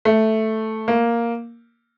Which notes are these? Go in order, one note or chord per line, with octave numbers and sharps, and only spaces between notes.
A3
A#3